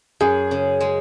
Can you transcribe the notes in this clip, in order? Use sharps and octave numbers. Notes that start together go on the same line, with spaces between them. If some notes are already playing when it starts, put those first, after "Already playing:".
F#2 G#4
C#3
G#3